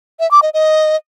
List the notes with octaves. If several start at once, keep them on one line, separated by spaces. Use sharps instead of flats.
E5
D6
D#5
D#5